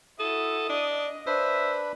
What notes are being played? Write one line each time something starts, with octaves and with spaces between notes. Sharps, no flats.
E4 F#4 A4 D#6
D4 D#5
D4 B4 C5 E5